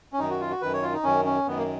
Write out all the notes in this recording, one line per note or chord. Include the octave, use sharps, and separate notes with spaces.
C#4
F#2 D#3 D#4
F#4
F4
F#4
F#2 D#3 B4
C#5
F4
D#4
F#2 D#3 C#4
C#4
F#2 D#3 B3
A#3